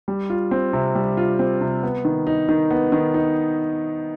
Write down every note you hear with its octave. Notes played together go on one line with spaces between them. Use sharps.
G3
F4
C4
C3
G3
F4
C4
C3
B3
D#3
D#4
D#3
B3
D#3
D#4